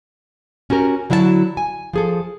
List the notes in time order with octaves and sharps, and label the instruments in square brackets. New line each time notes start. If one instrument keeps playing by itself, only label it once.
[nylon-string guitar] C#4 F#4 G4 A#4
D3 F#3 E4 F#4 E5 A5
G#5
F3 G#4 A4